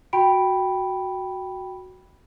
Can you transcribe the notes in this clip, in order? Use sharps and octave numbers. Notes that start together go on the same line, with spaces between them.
F#4 G5 B5 D7